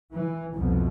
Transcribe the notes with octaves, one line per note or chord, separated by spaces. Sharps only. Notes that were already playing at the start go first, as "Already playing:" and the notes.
E3
C2 F2 B2